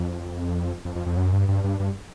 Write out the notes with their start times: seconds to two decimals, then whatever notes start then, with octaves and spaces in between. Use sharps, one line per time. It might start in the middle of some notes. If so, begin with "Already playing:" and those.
Already playing: F2
0.85 F2
0.96 F2
1.06 F2
1.17 F#2
1.32 G2
1.48 G2
1.64 G2
1.80 G2